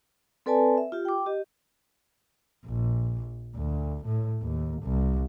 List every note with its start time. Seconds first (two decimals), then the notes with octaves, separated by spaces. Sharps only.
0.46 C4 A4 B4 D5 G#5 A5
0.77 E5
0.92 F4 G4
1.05 G5 D6
1.26 G4 D#5
2.66 A#1
3.56 D2
4.06 A2
4.43 D#2
4.83 C2